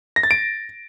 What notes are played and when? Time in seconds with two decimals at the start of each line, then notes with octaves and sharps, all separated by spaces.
0.16 A#6
0.23 A6
0.31 D7